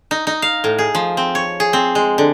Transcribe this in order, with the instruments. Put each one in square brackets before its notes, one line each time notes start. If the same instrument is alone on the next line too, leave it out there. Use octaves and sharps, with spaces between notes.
[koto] D#4
D#4
F5
A2
G#4
F3
C4
C#5
G#4
C4
G#3
D3